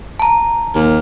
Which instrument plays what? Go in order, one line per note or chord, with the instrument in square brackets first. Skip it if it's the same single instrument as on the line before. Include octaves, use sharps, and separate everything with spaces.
[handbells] A5 A#5
[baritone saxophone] D#2